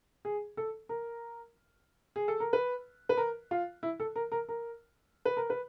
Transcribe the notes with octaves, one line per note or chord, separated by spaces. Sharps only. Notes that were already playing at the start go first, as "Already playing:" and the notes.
G#4
A4
A#4
G#4
A4
A#4
B4
B4
A#4
F4
E4
A4
A#4
A#4
A#4
B4
A#4
B4